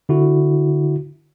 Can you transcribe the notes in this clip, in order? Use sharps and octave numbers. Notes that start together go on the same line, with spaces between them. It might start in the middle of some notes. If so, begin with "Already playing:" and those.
D3 E4 F#4